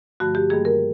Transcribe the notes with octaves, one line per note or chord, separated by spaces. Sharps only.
G2 D3 F3 A3 F#4
G4
G2 D#3 G3 A#3 G#4
A#4